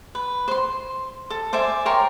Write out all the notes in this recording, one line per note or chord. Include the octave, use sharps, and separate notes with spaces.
B4
C5 C6
A4
C5 D5 E5 G#5
A#4 C#5 G5 C6